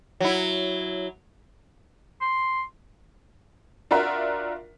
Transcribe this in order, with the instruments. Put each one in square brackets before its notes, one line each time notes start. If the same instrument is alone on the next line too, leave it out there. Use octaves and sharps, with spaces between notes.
[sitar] F#3 E4
[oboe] C6
[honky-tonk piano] D4 F4 F#4 A#4 E5